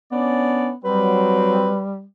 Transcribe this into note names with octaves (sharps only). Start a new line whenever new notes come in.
B3 C#4 D4 D5
F#3 G3 C4 B4